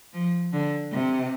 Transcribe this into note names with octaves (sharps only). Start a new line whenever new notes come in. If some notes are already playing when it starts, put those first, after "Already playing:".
F3
D3
C3